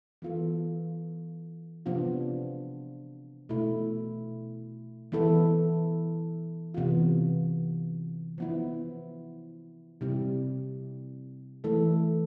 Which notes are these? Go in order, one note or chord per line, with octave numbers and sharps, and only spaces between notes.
E3 B3 F4 A4
C3 F3 B3 D4 F4
B2 A3 E4
E3 B3 E4 A4
C3 E3 B3 F4
F3 B3 E4
C3 G3 C4 E4 G4
E3 A3 E4 A4